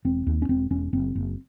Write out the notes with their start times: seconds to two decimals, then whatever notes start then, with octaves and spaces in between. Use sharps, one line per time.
0.05 E1 C4
0.27 D#2
0.42 C#4
0.49 E1 C4
0.71 E1 C#4
0.93 F#1 C4
1.15 F#1